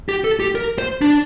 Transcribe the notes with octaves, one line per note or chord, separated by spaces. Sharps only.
G4
A4
G4
A#4
C5
D4